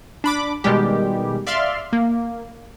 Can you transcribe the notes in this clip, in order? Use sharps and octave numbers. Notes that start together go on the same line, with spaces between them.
D4 B5 D6
B2 D#3 G3 G#3 G4
D5 E5 F5 C6 F6
A#3